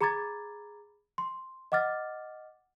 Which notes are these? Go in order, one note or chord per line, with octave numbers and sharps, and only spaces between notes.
G#4 A#5 B5 D6 G#6 A6
C6
D#5 F#5 D6 F6 A6